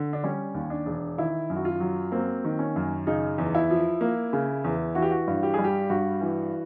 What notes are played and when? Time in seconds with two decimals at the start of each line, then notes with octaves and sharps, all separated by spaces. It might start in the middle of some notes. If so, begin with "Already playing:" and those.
Already playing: D3
0.13 D4
0.24 G3 C#4
0.54 D#2
0.70 D4
0.86 E1
1.18 D#3 E4
1.50 F#2
1.56 F#4
1.65 F4
1.80 F#3
2.12 A#3 C4
2.44 D#3
2.59 C#4
2.76 F#2
3.07 C#3 D#4
3.38 E2
3.55 E4
3.70 F3
4.01 A#3
4.33 C#3
4.64 E2
4.95 E3 F#4
5.02 G4
5.11 F#4
5.27 G2
5.43 G4
5.54 G#4
5.59 G3
5.64 G4
5.90 G2 F#4
6.21 E3